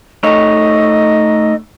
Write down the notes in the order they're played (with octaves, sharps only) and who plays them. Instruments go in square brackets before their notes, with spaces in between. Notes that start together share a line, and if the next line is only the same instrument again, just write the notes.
[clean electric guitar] A3 D#4 C#5 [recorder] D#5